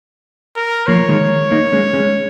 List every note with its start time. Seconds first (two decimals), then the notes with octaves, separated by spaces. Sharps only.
0.56 A#4
0.87 F3 A#3 C#5
1.09 D#3 G#3
1.51 A#3 D#4
1.72 G#3 C#4
1.93 G#3 C#4